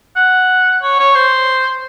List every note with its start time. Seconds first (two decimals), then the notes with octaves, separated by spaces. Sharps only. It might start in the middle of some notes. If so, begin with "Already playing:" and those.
0.16 F#5
0.82 C#5
0.99 C#5
1.15 C5